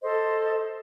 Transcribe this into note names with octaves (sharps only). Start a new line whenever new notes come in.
A4 C5 D#5